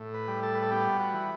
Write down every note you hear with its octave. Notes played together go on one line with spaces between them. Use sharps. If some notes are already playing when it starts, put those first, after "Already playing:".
Already playing: A2
B4
G3
A4
B4
A4
B3 G4
F#4
E3